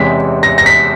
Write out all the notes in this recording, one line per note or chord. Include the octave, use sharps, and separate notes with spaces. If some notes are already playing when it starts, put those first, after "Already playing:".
Already playing: E2 C3 E3 G#3 C#4 B6
A#6
A#6
B6